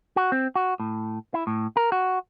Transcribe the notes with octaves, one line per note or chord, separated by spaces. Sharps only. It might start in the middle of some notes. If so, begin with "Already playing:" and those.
F#4
C4
F#4
A2
E4
A2
A#4
F#4